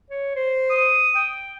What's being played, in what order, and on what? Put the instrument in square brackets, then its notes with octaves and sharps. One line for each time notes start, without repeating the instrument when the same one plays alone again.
[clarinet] C#5
C5
[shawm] D#6
[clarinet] G5